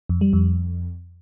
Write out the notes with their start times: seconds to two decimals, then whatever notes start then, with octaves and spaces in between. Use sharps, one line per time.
0.09 F2
0.21 G3
0.33 F2